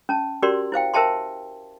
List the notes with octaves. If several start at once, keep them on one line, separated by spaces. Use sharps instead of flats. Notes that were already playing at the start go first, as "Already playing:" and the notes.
C#4 A5
C#4 F#4 G4 A#4 D5 C6
E4 C5 F5 G5
A#4 C5 E5 G5 A5 C6